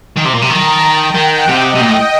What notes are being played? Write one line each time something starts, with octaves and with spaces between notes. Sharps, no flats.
D#3 A#5
C3
A#2
C3
D#3 A5
G5
D#3 F#5
C3 D#5
C3
A#2 G5
A2